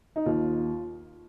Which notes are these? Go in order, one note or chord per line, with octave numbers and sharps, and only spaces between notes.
D#4
D#2 F4